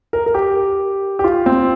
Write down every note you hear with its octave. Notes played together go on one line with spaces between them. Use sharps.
A#4
A#4
G4
G4
F4
C4